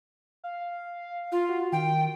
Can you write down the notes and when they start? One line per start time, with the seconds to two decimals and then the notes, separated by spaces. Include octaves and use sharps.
0.44 F5
1.32 F4 F5
1.49 F#4
1.72 D#3 G5